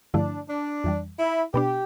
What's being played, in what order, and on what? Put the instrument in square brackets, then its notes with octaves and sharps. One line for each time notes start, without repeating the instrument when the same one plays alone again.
[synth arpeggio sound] G2 D3 F3 A3 E4 [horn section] D4
[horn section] D4
[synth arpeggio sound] F2 E3 G3
[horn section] E4
[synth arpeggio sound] B2 B3 D4 [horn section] G4